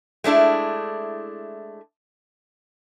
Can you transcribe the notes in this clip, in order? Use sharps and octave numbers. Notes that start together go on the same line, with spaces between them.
G#3 A3 D4 E4